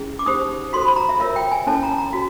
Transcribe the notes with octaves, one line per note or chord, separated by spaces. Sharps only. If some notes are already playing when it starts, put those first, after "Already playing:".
Already playing: C#4 E4 G#4
D6
D#4 G4 C5 D#6
F#4 A4 C5 C6
B5
A#5
E5
F4 A#4 C#5 E5
G5
G#5
C#4 E4 A4 C#5 A5
A#5
A#5
F#4